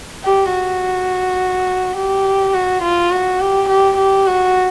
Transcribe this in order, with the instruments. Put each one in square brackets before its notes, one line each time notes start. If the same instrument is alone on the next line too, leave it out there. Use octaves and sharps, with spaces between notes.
[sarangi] G4
F#4
G4
F#4
F4
F#4
G4
G4
G4
F#4